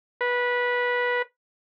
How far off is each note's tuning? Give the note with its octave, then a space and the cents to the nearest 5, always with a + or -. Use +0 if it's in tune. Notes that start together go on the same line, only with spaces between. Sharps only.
B4 -15